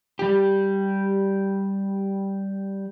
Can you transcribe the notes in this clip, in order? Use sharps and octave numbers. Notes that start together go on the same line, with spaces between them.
G3 G4